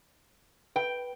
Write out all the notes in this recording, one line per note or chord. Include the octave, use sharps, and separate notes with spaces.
B4 G5